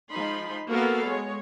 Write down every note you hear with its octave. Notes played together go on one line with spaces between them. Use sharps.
F3 G#3 D#4 B5 C6
A#3 B3 F#4 A4 A#4 F5
G#3 C#5